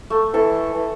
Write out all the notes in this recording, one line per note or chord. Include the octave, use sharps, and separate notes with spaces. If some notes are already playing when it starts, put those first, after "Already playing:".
A3
E3 A4 A5
E3